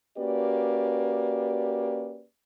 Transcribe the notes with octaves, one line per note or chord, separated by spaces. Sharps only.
A#3 C#4 F#4 G4 B4 D5